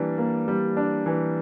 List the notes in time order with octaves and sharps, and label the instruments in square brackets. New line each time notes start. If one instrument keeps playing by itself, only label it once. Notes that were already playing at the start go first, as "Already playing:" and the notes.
Already playing: [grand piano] E3 G3 A#3 D4
A#3
G3
D4
E3